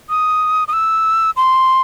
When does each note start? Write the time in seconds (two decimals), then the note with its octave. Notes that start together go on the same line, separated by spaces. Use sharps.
0.10 D#6
0.68 D#6
0.73 E6
1.37 C6